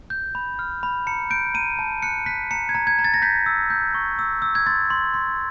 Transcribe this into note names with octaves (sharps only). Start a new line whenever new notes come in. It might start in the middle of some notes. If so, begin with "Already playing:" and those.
G6
B5
F6
B5
A#5 C#7
G6 D7
A#5 D#7
A5
F#6 C#7
F#6 B6
A#5 C#7
G#6
A#5
G#6
A#5
A6
A#6
G6 B6
E6
G6
C#6
E6
E6
G#6
C6 A6
C6
C6